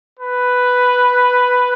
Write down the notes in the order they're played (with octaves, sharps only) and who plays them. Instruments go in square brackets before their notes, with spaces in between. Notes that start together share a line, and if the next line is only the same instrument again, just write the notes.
[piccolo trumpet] B4